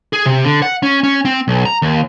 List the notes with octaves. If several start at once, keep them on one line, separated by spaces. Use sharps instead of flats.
G#4
C3
D3
F#5
C#4
C#4
C4
B1
A#5
D#2